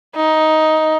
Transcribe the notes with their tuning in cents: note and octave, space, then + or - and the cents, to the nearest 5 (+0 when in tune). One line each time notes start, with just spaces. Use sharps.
D#4 +10